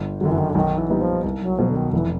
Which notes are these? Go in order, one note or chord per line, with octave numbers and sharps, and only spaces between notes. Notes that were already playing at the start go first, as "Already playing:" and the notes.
Already playing: G1
F#2 D3 D#3 F#3
E3
D#3
D3
B1 D#3
E3
A#2 G3 B3 D#4
F3
C2
F#3
B2 F3 F#3 B3
D3
D#3
F1 E3